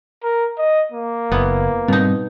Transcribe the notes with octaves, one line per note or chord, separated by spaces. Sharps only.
A#4
D#5
A#3
F#1 B3 E4
G#2 B2 G3 C4 D#4